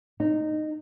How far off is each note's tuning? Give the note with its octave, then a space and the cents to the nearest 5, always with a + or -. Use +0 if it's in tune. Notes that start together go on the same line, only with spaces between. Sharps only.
D#4 -15